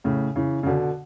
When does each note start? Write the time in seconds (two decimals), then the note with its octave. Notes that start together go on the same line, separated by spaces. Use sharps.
0.04 A2 C#3
0.36 C#3 E3
0.63 C#3
0.66 B2 D3